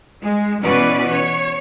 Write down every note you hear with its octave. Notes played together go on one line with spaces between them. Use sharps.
G#3
B2 E3 C#4 F#4 B4 D5
C#5